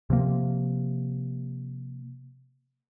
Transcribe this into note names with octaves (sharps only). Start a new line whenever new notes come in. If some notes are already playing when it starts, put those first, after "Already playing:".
C3 F3 A#3